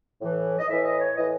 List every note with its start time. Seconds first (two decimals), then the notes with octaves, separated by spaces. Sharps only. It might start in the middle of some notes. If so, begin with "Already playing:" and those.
0.21 A2 E3
0.59 D#5
0.68 A2 E3 E5
0.84 D#5
0.99 C#5
1.15 A2 E3 D#5